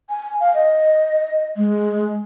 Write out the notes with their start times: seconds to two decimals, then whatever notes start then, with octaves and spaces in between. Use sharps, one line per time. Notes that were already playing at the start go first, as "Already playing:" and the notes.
0.10 G#5
0.40 F5
0.54 D#5
1.56 G#3